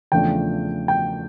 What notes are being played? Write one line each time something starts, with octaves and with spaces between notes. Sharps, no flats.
E2 C#3 F3 A3 D4 G5
G5